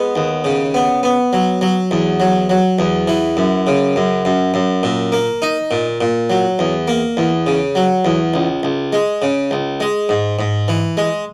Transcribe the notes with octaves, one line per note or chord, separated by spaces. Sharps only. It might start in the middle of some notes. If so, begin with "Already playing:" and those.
Already playing: G#3 B3
D#2
C#3
B3
B3
F#3
F#3
E2
F#3
F#3
E2
E3
F#2
C#3
F#2
F#2
F#2
A#2
A#3
D#4
A#2
A#2
F#3
E2
A#3
E2
C#3
F#3
E2
C#2
C#2
G#3
C#3
C#2
G#3
G#2
G#2
E3
G#3